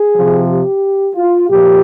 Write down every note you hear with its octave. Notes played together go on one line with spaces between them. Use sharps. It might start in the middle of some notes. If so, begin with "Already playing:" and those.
Already playing: G#4
C3 F3
G4
F4
A#2 F3 G4